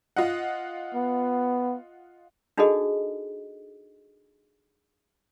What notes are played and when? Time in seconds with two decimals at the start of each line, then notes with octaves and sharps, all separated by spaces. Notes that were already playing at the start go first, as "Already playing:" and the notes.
0.16 F4 D#5 F#5
0.95 B3
2.57 D4 D#4 F#4 G#4 A4 D#5